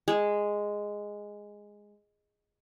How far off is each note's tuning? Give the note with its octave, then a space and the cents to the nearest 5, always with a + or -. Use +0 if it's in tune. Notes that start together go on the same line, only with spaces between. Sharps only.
G#3 -5